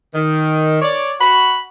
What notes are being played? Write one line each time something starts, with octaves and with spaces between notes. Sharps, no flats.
D#3
C#5 D5
F#4 B5